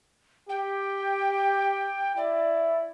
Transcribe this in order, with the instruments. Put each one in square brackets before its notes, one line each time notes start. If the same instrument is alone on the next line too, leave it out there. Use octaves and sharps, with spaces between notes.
[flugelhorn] G4 [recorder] G5
[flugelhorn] E4 [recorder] D5